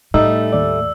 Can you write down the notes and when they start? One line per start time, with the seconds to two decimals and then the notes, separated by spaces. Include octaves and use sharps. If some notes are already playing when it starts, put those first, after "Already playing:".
0.14 A2 G3 A3 D#4 E6
0.53 D#2 D5